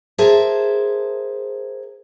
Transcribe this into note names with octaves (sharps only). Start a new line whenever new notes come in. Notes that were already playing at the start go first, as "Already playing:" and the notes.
G#4 A#4 C5 E5 A5